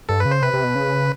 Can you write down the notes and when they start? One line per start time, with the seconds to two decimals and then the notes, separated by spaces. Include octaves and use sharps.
0.09 G2 A4
0.20 B4
0.25 C#3
0.31 C5
0.42 C3 B4
0.53 C3
0.64 B2
0.75 C#3